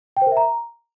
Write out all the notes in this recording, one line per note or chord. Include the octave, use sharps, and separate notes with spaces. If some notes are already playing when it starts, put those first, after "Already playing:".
G5
C5
A#4
E5
A#5